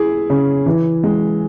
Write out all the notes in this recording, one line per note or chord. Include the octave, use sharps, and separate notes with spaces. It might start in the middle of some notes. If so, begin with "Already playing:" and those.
Already playing: E4 G#4
C#3
E3
G#3